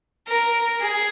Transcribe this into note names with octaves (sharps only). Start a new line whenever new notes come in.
A#4
G#4